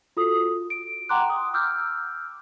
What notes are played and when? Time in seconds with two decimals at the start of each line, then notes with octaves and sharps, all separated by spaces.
0.17 F4 F#4 A4 D#6
0.70 D7
1.09 F#5 G5 A#5 C6 D6 F#6
1.30 D#6
1.54 D6 E6 F6 G6